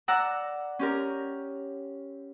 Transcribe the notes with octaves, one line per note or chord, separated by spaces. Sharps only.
D5 F#5 A#5 E6
C#4 G4 A#4